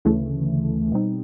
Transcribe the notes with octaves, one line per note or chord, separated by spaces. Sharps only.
D2 C#3 E3 A3
B2 G3 C4 D#4